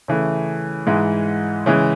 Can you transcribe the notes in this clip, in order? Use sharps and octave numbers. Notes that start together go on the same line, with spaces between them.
C#3 E3 A3
G#2 E3 G#3
C#3 E3 G#3